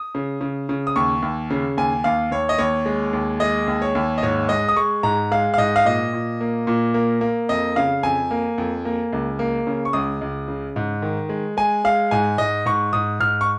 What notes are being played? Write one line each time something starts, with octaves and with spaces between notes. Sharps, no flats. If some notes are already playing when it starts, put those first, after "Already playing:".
Already playing: D#6
C#3
C#3
C#3
D#6
D#2 C#6
D#2
C#3
D#2 G#5
D#2 F5
D#2 C#5
D#5
D#2 C#5
G#3
D#2
G#3 D#5
D#2
C#5
D#2
D#5
G#2 C#5
G#3 D#5
D#6
G#3 C#6
G#2 A#5
G#3 F5
F5
G#2 D#5
F5
A#2 D#5
A#2
A#3
A#2
A#3
A#3
F2 D#5
C#3 F5
F2 G#5
A#3
F2
A#3
C#2
A#3
C#3
C#6
C#2 D#6
C#2
C#3
G#2
D#3
G#3
G#3 G#5
G#3 F5
G#2 G#5
G#2 D#5
G#2 C#6
G#2 D#6
G#2 F6
C#6